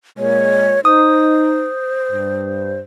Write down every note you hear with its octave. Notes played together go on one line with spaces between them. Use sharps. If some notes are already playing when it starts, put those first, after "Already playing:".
A#2 G#3 C#5
D#4 C5 D#6
G2